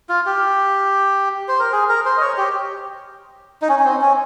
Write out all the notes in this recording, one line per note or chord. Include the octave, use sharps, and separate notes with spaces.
F4
G4
C5
A#4
G#4
A#4
C5
D#5
C#5
G4
D#4
C#4
C#4
C4
C#4